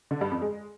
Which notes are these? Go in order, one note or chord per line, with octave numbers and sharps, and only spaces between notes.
D3
G2
F2
G#3